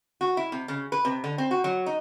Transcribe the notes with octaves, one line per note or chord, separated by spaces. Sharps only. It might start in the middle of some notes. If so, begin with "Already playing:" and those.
F#4
E4
C3
C#3
B4
C3
D3
C4
F#4
F#3
D#4